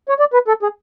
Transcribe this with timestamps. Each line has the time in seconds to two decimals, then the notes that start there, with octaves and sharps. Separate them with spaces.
0.09 C#5
0.19 D5
0.33 B4
0.48 A4
0.63 G#4